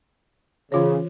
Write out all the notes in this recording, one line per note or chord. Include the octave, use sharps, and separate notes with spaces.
C#3 E3 F4 C#5